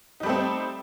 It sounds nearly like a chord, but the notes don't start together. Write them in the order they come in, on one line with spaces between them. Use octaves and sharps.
D#4 G3 A3 C4